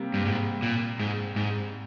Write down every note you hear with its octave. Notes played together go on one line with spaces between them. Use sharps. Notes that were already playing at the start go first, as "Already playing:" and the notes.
Already playing: C3 G3 A#3
G2
G#2
A#2
G#2
G#2